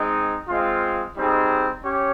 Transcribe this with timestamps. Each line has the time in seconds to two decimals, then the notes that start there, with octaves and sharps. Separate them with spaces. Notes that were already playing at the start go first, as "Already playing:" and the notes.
Already playing: G#3 C4 D#4
0.48 G#3 C4 F4
1.15 G3 C4 D#4 G#4
1.82 C#4 G4 C#5